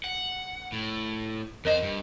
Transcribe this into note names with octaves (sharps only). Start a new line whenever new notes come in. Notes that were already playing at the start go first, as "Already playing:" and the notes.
F#5
A2
F2 A#4 C5 D#5
G2